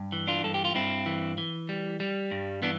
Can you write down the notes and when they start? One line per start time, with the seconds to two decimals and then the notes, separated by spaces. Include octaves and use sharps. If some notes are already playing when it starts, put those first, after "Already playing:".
Already playing: G2
0.12 E3
0.27 D4 F4
0.44 G2 A4
0.54 G4
0.65 F4
0.75 G2 C4 E4
1.06 E3
1.38 E3
1.69 G3
2.00 G3
2.31 G2
2.62 E3 B3 D4